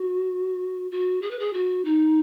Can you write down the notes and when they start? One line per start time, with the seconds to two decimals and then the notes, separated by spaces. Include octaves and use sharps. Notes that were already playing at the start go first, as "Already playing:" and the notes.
Already playing: F#4
0.91 F#4
1.22 G#4
1.31 B4
1.39 G#4
1.53 F#4
1.85 D#4